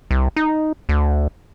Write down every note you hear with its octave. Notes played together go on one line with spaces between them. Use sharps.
C2
D#4
D2